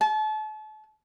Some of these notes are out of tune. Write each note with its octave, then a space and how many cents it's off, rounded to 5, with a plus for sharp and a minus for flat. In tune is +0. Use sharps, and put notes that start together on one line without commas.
A5 -35